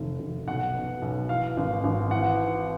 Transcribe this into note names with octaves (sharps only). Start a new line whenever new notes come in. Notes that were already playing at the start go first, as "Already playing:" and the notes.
Already playing: F1 D#3
F1
B1 F#5
B2
B1
E3 F5
G#1
G#1
E3 F#5